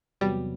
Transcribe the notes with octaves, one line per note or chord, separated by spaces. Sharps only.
E2 C3 F#3 G3 B3